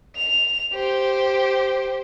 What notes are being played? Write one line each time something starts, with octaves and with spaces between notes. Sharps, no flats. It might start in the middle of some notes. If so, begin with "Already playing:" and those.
F7
G4 C5